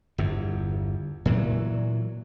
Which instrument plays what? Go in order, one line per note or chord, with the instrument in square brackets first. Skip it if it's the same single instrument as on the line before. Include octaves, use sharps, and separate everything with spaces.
[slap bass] G1 E2
A#2 E3 F#3